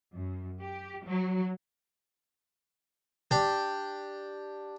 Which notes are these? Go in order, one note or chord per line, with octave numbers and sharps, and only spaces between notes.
F#2
G4
F#3
D4 G4